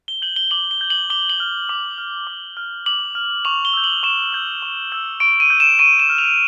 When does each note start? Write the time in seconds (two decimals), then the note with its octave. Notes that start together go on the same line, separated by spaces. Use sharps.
0.08 G7
0.22 G6 F#7
0.36 G7
0.51 D6 F#7
0.71 G7
0.81 G6
0.90 F#7
1.10 D6 G7
1.30 F#7
1.40 F6
1.69 D6
1.98 F6
2.27 D6
2.57 F6
2.86 D6 F#7
3.15 F6
3.45 C#6 F7
3.65 G7
3.74 E6 G6
3.84 F#7
4.03 C#6 E7
4.33 E6 G6
4.62 C#6
4.92 E6 G6
5.20 C#6 D7
5.40 D#7
5.50 E6 G6
5.60 E7
5.79 C#6 D#7
5.99 E7
6.09 F6
6.18 F7